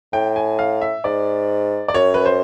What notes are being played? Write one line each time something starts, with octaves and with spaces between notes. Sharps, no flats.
A2 G5
G#5
F5
E5
G#2 D5
D5
F#2 C#5
B4
C5